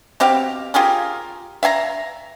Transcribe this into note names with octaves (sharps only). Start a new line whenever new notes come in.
B2 C4 G4 F5
F4 G4 G#4 A#4
E5 F5 G#5 A#5